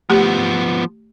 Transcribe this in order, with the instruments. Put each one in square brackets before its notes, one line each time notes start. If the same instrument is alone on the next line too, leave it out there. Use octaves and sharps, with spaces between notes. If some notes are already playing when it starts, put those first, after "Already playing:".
[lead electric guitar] F3 B3 [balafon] A3 G4